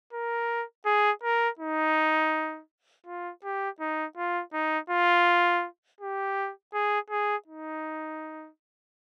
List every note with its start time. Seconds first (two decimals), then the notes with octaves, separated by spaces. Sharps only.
0.13 A#4
0.86 G#4
1.24 A#4
1.59 D#4
3.06 F4
3.44 G4
3.80 D#4
4.17 F4
4.53 D#4
4.90 F4
6.01 G4
6.74 G#4
7.10 G#4
7.47 D#4